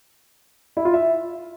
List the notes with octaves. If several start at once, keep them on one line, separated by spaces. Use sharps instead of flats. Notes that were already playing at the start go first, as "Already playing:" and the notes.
E4
F4
E5